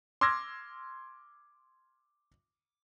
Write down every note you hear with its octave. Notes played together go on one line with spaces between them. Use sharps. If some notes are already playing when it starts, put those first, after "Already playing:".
C6 D6 E6 F6 G#6 A#6